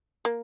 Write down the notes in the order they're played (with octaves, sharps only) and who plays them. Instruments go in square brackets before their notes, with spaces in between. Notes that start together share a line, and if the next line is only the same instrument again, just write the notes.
[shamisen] A#3